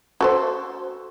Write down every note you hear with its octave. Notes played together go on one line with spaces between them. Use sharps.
F#4 A4 C5